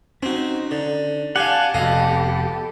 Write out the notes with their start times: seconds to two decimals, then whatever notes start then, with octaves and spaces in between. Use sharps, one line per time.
0.23 C4 C#4 D#4 F#4
0.71 D3
1.36 G4 D5 F5 F#5 G#5 A5
1.74 F1 F2 C3 B3 G4 A4 D#5 F5